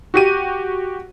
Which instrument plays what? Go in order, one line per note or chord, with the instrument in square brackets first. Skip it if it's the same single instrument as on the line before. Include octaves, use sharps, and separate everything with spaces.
[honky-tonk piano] F#4 G4 D#7